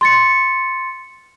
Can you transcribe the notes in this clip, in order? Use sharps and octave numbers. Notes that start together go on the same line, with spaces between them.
C6 A6 C#7